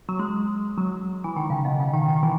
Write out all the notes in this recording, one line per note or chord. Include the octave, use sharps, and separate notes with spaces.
F#3
G#3
F#3
E3
D#3
C#3
B2
C#3
D#3
D#3
E3